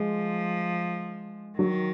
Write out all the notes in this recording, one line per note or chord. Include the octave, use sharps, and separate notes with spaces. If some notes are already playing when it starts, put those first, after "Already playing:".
Already playing: F3 G#3
D#3 F#3